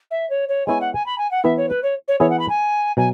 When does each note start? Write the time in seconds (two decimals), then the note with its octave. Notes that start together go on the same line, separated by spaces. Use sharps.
0.11 E5
0.30 C#5
0.49 C#5
0.67 G#3 B3 E4 C#5 G#5
0.81 F#5
0.94 G#5
1.06 B5
1.18 G#5
1.31 F#5
1.44 E3 B3 E4 E5
1.57 C#5
1.69 B4
1.83 C#5
2.08 C#5
2.20 E3 B3 E4 G#4 C#5
2.30 F#5
2.39 B5
2.49 G#5
2.97 B2 F#3 G#5